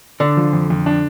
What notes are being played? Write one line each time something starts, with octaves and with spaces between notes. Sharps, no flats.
D3 D4
F3
F2
F2
D4